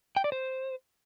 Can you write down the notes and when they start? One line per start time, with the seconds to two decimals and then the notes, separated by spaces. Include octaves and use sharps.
0.16 G5
0.24 D5
0.32 C5